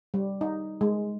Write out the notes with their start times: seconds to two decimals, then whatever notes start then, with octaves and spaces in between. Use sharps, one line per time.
0.14 G3
0.41 D#4
0.81 G#3